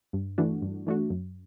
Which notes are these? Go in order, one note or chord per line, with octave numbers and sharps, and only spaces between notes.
G2
E3 A3 D4 F#4
G2
E3 A3 D4 F#4
F#2